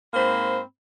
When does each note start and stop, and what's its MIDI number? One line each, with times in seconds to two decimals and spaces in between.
0.14 0.61 44
0.14 0.61 58
0.14 0.61 60
0.14 0.61 72
0.14 0.61 83